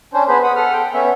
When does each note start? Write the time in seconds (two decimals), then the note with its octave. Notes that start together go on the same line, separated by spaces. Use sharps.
0.14 C#4 D4 C5
0.28 B3 G#4 B4 C5
0.43 F#5 B5 D#6
0.56 A4 F#5 F6
0.73 G5
0.94 B3 C#4 E5